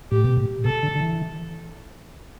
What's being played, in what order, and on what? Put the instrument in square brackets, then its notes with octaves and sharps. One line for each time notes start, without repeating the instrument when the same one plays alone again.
[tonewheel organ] A2 [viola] G4
[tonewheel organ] B2
A2
[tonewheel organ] B2 [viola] A4
[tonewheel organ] D3
D3
E3